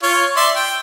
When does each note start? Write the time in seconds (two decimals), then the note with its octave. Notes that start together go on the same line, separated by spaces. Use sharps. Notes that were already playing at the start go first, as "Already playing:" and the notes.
0.03 F4 C#5
0.36 D5 E5 C6
0.55 G5